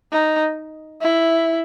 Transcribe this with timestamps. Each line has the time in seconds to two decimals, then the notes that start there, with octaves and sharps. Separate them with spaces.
0.12 D#4
1.01 E4